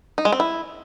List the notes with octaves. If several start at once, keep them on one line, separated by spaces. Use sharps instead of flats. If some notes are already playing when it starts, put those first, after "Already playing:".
D#4
G#3
C4
E4